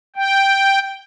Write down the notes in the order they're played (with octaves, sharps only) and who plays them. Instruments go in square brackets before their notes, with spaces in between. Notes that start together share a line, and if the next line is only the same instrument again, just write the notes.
[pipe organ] G5